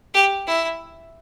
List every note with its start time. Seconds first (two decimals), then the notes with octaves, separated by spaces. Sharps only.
0.14 G4
0.47 E4